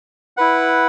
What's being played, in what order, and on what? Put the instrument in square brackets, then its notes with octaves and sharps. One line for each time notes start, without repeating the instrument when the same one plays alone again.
[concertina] E4 B4 F#5